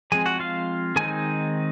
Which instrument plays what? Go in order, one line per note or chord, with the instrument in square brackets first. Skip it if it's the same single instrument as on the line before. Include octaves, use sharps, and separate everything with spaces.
[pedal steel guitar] F3 G#3 C4 G#4 G#5
F#4 F#5
F4 F5
D#3 G#3 C4 D#4 G#4 G#5